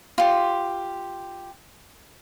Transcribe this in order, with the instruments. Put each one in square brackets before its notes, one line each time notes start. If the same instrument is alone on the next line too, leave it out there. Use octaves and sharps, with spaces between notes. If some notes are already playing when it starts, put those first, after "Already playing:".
[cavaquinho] F4 G4